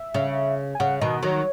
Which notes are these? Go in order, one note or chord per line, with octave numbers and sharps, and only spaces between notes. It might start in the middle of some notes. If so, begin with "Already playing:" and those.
Already playing: E5
C#3
G#5
C#3 F#5
B2 D#3 D#5
D#3 F#3 C#5